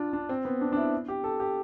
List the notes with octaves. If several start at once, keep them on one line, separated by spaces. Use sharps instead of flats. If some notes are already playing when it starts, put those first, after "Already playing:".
Already playing: D4 F4
D4
C4
B3
D4
D4
E4
G4
A4
G4